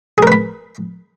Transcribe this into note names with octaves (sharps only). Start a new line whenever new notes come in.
G#4 A#4 B4 B5